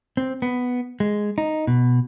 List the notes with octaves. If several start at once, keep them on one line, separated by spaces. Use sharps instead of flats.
C4
B3
G#3
D#4
B2